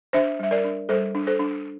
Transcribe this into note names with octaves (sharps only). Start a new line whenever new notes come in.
D4 C5 E5
G3 E5
A#4 D5
D4
G3 A4 C5
D4
A4 C5
D4